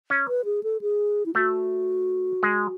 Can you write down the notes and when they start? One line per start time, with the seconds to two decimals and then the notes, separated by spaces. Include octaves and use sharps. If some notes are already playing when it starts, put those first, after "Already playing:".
0.10 C#4
0.28 B4
0.45 G#4
0.63 A4
0.81 G#4
1.26 E4
1.35 A3 F#4
2.43 G#3